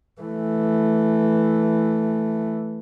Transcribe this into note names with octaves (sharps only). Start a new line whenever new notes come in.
E3 A3